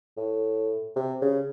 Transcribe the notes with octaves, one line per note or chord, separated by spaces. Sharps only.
A2
C3
C#3